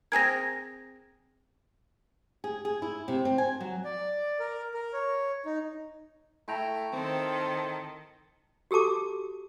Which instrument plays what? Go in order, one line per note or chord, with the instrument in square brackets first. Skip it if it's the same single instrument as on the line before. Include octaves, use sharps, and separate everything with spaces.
[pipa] C4 G#4 A#4 [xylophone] G#6 A#6
[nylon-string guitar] G#4
G#4
E4
C3
C4
G#5
F#3
[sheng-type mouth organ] D5
A#4
A#4
C#5
D#4
[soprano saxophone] A3 [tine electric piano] E4 G5 A#5
[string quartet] D#3 A4 [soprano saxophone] C4
[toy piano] F#4 G4 A4 A5 D6